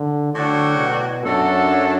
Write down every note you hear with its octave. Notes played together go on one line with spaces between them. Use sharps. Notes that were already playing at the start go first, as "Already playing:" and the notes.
Already playing: D3
A2 D3 F#3 D4 F#4
B2
F#2 F#3 D4 F#4 A4